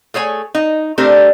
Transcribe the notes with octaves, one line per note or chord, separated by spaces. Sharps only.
A3 G#4 C#5 G#5
D#4
A3 C4 D4 G4 A#4